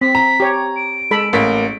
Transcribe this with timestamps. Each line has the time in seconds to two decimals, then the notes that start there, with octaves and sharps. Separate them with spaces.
0.01 C4 B6
0.15 A#5
0.40 G4 C#5
0.76 D7
1.11 G#3 A4 B5
1.33 A1 A#3 B6